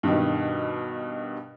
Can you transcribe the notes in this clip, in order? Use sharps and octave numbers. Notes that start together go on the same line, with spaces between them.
G2 B2 D#3